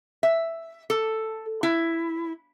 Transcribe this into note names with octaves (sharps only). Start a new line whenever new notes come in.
E5
A4
E4